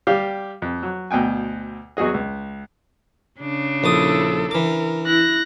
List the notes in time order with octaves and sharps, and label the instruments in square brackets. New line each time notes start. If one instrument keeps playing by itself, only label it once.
[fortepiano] G3 G4 F5
F2
F#3
D2 B2 G5 G#5
E2 F#3 F#4 G#4 D#5
C#2
[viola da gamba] C#3 D4
[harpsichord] A#1 D6 D#6 [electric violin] E4 A4
[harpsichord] E3 D6 [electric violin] A#4
[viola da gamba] E4 [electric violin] F#6 A#6